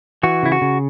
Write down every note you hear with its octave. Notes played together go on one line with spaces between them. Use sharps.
E3 F#4
C#3 E4
F#4
C#3